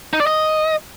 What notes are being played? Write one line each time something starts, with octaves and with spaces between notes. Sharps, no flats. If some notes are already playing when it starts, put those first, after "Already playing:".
D#4
D5
D#5